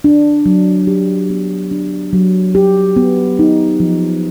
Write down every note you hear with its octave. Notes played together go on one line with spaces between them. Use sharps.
D4
F#3
G4
B3
D4
F#3
G4
B3
D#4
F3